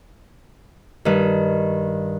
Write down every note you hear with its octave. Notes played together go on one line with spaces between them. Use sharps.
G2 D#3